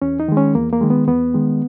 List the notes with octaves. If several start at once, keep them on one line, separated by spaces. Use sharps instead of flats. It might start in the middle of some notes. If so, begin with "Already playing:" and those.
E2 C#4
D#4
D#3 G#3
C#4
E2 A#3
A#3
D#3 G#3
B3
E2 B3
D#3 G#3